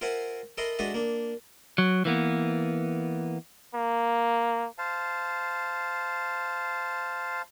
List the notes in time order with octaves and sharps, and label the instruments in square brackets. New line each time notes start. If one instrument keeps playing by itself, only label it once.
[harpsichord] F4 A#4 C5 E5 F#5 G#5
A4 A#4 D#5 E5 B5 C6
G#3 D4 F#4 A4 D#5 E5
A#3 D4
[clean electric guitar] F#3
E3 A#3 B3
[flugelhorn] A#3
[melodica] C5 F5 A5